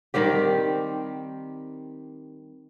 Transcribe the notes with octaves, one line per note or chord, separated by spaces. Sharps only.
D#3 G3 C4 G4